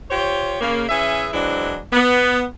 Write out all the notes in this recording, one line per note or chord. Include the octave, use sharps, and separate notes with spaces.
F4 G4 C5 C#5
C#3 A#3
E3 C#4 G#4 E5
E3 F#3 G#3 C4 D4 E4
B3